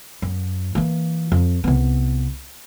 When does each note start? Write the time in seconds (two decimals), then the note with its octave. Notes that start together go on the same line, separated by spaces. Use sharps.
0.22 F#2
0.75 E3 A#3
1.32 F2
1.64 C2 B3